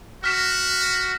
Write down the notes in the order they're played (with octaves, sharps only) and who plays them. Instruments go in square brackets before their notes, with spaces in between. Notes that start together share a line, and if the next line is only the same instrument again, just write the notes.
[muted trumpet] F#4 [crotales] F6 B6 E7